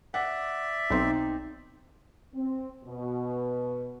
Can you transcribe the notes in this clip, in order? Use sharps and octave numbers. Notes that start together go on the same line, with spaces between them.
D5 E5 F#5
B1 C4 D#4 C6
C4
B2